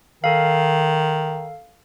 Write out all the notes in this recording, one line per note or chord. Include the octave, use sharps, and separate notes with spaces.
D#3 A4 F5